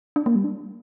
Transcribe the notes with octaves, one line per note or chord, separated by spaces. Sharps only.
D4
A#3
G3
D4